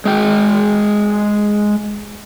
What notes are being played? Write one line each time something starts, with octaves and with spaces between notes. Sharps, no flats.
G#3 G5